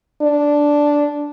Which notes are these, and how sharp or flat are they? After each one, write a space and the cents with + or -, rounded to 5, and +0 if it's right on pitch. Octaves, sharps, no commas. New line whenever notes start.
D4 -5